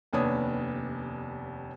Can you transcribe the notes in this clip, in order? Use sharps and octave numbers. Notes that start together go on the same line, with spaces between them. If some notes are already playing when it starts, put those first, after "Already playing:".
F1 D#2 B3 D4 C#5 D#6